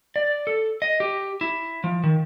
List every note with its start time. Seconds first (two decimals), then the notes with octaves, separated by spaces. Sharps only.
0.16 D5
0.47 A4
0.82 D#5
1.00 G4
1.41 E4
1.84 F3
2.04 D#3